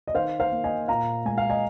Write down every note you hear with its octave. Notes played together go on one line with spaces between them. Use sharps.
D#5
D#3 C5 F5
C5 F5
A#3
D#5 G#5
A#2 F5 A#5
G#3 G#5
F5
D#5 G#5